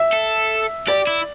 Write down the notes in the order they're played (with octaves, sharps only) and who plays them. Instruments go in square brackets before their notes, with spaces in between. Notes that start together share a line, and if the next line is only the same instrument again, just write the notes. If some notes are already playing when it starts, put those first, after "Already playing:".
Already playing: [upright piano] E5
[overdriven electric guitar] A4
[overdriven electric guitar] G4 [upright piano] D5
[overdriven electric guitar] E4